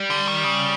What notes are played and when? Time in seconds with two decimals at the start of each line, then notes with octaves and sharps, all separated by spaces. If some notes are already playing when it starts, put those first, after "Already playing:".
Already playing: G3
0.10 D3
0.27 D#3
0.44 C#3